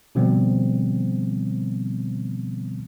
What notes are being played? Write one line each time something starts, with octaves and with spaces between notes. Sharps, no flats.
B2 D3 F3 G3 B3 C4